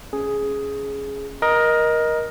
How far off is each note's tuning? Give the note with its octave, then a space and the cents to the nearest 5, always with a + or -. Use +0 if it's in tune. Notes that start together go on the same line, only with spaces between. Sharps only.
C#4 +0 G#4 +5
A#4 +20 D#5 +0